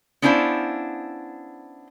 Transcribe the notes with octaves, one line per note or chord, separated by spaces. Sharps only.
B3 C#4 D4 E4 C5 F5